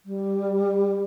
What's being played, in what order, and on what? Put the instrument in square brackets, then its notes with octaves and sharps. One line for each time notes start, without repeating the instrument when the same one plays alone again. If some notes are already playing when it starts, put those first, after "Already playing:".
[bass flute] G3